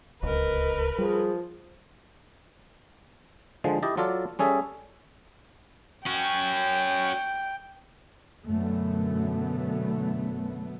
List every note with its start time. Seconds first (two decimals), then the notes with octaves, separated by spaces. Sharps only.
0.23 D1 C#2 A#4 B4 D#5
0.98 F3 G3 G#4
3.64 D3 F3 G#3
3.83 E4 G4 D#5 A5
3.97 F#3 F4 A4 D5
4.39 G3 C#4 G#4 A4 E5
6.06 C#4 F#4 G5
8.46 F#2 B2 D3 A3 B3